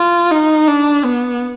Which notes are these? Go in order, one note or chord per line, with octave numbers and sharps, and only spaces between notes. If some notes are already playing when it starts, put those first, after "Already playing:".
Already playing: F4
D#4
D4
B3